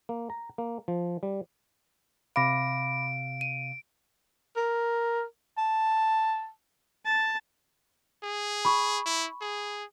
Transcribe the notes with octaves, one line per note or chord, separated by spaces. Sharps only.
A#3
A#5
A#3
F3
G3
C3 F5 B5 D6 A#6 D7
D#7
A#4
A5
A5
G#4
B5 C#6
E4
G#4